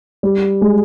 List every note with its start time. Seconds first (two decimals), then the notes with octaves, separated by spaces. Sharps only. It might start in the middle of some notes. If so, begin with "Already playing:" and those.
0.23 G3
0.61 G#3